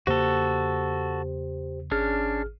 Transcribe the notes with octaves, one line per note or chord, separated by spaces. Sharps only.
E2 C#3 A#3 F#4 G4 A4 C5
G#1 C#4 D4 G#4 F6